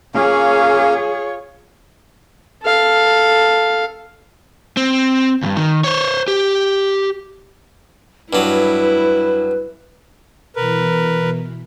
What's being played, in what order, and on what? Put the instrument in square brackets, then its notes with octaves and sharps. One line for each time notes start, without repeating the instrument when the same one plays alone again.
[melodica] A#3 C#4 F5 [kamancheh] F4 C#5 [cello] G#4
[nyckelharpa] A4 F5
[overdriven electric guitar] C4
C#2 G2
D#3
C5 C#5
G4
[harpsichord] G2 F#3 [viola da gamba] E4 [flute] B4
[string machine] B2 E3 [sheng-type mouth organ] A#4 B4